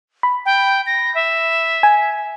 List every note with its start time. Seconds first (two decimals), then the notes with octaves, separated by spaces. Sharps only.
0.23 B5
0.46 G5
0.86 A#6
1.15 E5
1.83 G#5